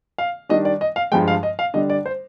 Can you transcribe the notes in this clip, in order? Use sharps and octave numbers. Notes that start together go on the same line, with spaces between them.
F5
D#3 G3 D4 D#5
D5
D#5
F5
G2 F3 G#3 G5
F5
D#5
F5
D3 G3 D4 D#5
D5
C5